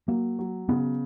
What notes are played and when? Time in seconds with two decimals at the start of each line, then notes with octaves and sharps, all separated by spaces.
0.08 F#3 A#3
0.39 F#3
0.69 C#3 B3